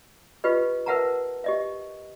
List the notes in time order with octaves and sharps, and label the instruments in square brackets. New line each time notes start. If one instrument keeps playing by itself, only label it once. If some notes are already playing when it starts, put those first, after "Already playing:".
[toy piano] F4 G4 B4 D#5
A#4 B4 E5 F#5 A5 A#5
G4 D#5 E5